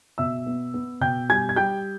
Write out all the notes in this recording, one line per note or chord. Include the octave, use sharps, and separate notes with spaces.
B2 E5 E6
B3
B3
B2 G5 G6
G3 G#5 G#6
G#6
G3 G5 G6